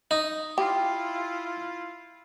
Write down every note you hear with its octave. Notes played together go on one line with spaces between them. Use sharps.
D#4
E4 F4 G4